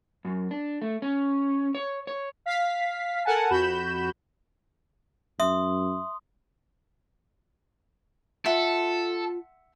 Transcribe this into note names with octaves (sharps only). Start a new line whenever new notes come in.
F#2
D4
A3
C#4
C#5
C#5
F5 B6
A4 A#4 F#5 G#5 A5
F2 F#4 B5 G6 E7
F#2 E5 C6 D#6
F4 A4 E5 F#5 C6